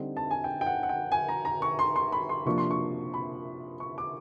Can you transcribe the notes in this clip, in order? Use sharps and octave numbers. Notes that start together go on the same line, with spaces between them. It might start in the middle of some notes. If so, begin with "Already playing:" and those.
Already playing: D3 G3 C4 D#4
A5
G#5
G5
G5
F#5
F#5
G5
G#5
A#5
A#5
C#6
C6
C6
B5
C6
C3 F3 A#3 D4 C#6
C6
C#6
B5
C#6
D6